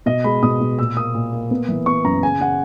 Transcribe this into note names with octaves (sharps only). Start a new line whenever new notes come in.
B2 D#5
G#3 B5
B2 D#6
B2
A#2 E6
A#3 D#6
A#2
A#3
B3
E3
B3 C#6
F#2 A#5
C#3 G#5
C#3 F#5